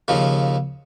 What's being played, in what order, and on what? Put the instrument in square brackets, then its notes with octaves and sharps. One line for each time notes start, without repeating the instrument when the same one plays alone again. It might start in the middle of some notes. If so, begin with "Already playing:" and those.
[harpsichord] D#2 C#3 F3